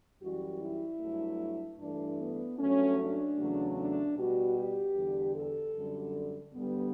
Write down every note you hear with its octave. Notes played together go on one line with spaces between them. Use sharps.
F#2 E3 G3 F#4
E4
G2 F#3 A3
G2 E3 A3 D4
B3
G2 F#3 A3 C#4
D4
E2 C#3 F#3 A3
D4
B2 G3 F#4
G4
E2 D3 G3
A4
F#2 D3 G3
G2 D3 G3 B3